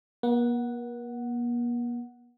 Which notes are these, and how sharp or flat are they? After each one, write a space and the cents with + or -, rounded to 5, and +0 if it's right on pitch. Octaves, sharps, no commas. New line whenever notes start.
A#3 +45 F#5 +0